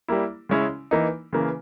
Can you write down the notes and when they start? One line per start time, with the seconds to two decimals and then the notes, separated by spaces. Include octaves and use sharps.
0.08 G3 A#3 E4
0.49 C#3 G#3 C#4 E4
0.91 E3 A#3 D#4
1.33 C#3 E3 A#3